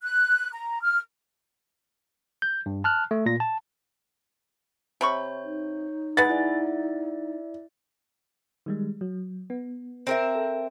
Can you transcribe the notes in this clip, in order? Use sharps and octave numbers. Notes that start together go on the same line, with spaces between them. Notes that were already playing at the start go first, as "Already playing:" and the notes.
F#6
A#5
F6
G6
G2
A5 F6 F#6
A3
A#2 A#6
A5
C3 C#5 B5 C#6 G6
D#4
G#3 B4 F#5 G#5 B5 A6
E4 D5 E5
D#3 G3 G#3
F#3
B3
C4 A#4 E5
A4